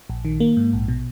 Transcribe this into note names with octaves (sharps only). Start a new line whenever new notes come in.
A#1
D#3
A#3
G#2
A#1
B2